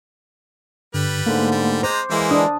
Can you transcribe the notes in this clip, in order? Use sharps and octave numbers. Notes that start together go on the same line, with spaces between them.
G2 D3 G3 B4
G#2 D3 A3 A#3
G3
G#3 C5 A#5 C6 D6 G6
E3 G#3 A#3 E4
D4 D#6